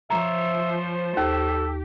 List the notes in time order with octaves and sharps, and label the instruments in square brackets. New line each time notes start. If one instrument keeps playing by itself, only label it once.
[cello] F3 [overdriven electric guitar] C5 C#5 [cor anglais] E5 [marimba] A#5
[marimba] D#2 [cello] G4 [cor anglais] A4